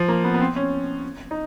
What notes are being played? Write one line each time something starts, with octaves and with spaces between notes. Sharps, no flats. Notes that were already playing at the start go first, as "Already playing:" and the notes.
Already playing: F3
A#3
B3
B3
C4
C#4
D#4